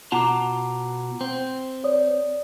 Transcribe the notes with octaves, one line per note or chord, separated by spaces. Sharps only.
B2 F4 F#5 A5 A#5 D6
C4
C#5 D5 D#6